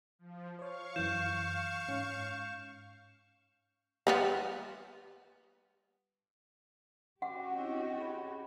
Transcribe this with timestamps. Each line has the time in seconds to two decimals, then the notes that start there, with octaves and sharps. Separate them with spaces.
0.19 F3
0.59 C5 C#5 F5 C#6
0.96 F#2 E3 G6 E7
1.88 G#2 C#4
4.07 G3 B3 F4
7.22 C#4 F#4 G4 F#5 D6
7.55 C4 D4 E4 D#5
7.97 G#4 B5